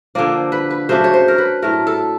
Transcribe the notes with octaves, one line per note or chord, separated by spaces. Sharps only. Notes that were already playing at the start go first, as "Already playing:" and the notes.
D3 F3 A#3 D5
B4
B4
C#3 F#3 A3 D4 C5
C#5
C5
A#4
B4
A2 F#3 A3 A#4
A4